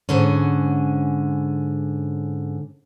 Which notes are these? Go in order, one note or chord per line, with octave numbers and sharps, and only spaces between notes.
G#2 D3 C#4